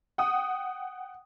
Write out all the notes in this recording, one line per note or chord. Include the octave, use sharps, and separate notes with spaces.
F#5 G5 D#6